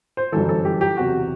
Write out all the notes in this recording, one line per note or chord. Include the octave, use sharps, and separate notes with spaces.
C5
G1 F#2 E3 A4
A4
G4
G4
F#1 E2 C3 F#3 F#4